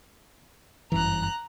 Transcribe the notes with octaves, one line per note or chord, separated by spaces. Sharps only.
G1 F#2 E3 A#5 F#6